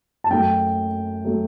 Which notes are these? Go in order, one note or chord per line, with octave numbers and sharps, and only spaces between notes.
A5
F#2 F#3 A3 G5
F#3 A3